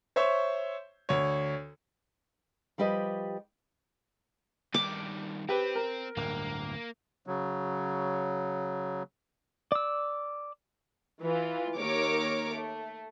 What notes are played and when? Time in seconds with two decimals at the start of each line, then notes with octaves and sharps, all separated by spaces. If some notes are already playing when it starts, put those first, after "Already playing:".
0.16 C5 C#5 E5 C#6
1.09 D2 C#5
2.78 F3 G3 G4 B4 D#5
4.74 G2 D#3 D6
5.49 C4 G4 B4
5.76 A#4
6.17 D1 G2 A#3
7.26 C#3 F#3
9.72 D5 E6
11.21 E3 F4
11.76 D#2 A#4 C#5 D6
12.54 A3